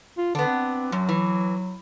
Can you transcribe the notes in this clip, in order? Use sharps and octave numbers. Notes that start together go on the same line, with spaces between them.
F4
D3 B3 D4
C4
F#2 F#3
E3